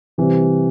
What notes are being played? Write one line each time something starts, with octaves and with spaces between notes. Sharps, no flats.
C3 E3 G3 C4